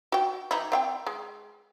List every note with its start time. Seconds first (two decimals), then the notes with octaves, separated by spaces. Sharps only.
0.12 F#4 G5
0.51 E3 D#4 E4
0.72 C4 F5 G5
1.07 G#3